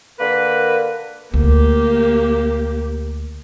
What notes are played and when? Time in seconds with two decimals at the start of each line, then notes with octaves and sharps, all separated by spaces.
0.19 D3 A#3 A#4 B4
1.34 D2 A#3 G4